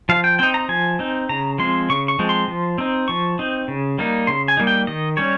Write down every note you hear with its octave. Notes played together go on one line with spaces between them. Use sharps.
F3 F5
G5
C4 D#4 G5
A#5
F3 G#5
C4 D#4
C#3 A#5
F3 G#3 C4 C6
C#3 C#6
C#6
F3 G#3 C4
C6
F3
C4 D#4
F3 C#6
C4 D#4
C#3
G3 A#3 D#4
C#3 C6
G#5
G3 A#3 D#4
G5
D#3 D#5
G3 C#4 C#5